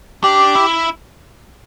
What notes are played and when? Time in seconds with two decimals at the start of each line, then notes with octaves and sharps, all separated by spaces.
0.24 D4 G4
0.55 E4